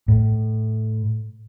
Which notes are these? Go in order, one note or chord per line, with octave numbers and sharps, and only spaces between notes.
A2